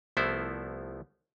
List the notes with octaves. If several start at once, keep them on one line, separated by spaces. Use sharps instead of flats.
C2 F3 A3 B3 E4 C5